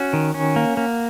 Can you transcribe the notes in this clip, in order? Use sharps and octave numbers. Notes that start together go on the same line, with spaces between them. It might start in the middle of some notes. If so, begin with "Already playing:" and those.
Already playing: C#4 F#4
D#3
C#4
A#3
A#3